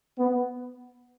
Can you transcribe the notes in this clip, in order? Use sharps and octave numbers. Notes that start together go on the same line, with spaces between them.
B3